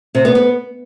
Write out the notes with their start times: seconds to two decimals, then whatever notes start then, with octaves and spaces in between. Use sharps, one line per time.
0.15 C3
0.25 B3
0.35 B3